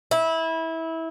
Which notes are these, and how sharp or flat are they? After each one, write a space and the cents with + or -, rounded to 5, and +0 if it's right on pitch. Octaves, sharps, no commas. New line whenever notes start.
E4 -20